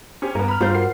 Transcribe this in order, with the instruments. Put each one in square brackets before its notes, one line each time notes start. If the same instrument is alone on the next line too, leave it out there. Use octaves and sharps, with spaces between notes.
[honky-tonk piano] C#4 G4 C5
[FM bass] G2 [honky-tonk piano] A#3 B3 [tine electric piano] A#5
[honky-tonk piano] B5 F6
[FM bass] G2 [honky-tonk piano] G3 [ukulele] F4 C5
[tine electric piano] F#4 A#4 F#5 [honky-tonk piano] C7